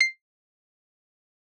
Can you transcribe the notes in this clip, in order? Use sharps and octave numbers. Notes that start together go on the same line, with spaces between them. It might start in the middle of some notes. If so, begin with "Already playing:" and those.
C7